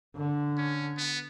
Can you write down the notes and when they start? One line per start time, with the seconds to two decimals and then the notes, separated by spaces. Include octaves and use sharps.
0.16 D3
0.58 C#4
0.97 B3